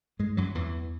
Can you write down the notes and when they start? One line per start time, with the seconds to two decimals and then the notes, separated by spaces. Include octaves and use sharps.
0.19 G#2 G#3
0.37 F#2 F#3
0.55 E2 E3